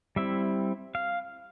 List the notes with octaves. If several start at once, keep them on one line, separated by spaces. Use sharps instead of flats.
G3 C4 E4 E5
F5